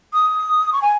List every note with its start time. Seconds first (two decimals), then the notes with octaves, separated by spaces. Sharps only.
0.13 D#6
0.73 C#6
0.82 G#5